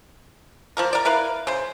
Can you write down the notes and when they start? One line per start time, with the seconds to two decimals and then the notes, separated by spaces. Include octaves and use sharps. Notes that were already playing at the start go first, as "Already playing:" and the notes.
0.77 F3 A#3 A#4
0.93 A#4 D5
1.05 E4 A#4 B4 F5
1.47 C#3 C5